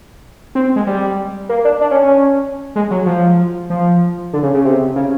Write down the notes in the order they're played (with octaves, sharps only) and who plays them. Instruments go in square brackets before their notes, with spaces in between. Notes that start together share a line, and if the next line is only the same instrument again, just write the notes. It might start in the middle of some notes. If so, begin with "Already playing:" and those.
[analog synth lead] C4
G#3
G3
A#3
D4
D4
C#4
C#4
G#3
F#3
F3
F3
D3
C#3
C#3
C3
C#3